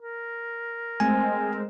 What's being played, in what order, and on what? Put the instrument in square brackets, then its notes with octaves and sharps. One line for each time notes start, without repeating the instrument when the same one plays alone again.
[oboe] A#4
[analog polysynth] G#3 C4 [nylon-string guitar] A3 B4 C5 [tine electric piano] G#5